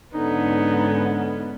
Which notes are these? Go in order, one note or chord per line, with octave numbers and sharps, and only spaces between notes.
G#2 D3 B3 C#4 D#4